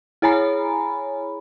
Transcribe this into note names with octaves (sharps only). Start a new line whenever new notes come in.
E4 G#4 C#5 G#5 A#5 B5